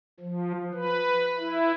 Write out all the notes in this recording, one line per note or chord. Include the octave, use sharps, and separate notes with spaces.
F3
B4
E4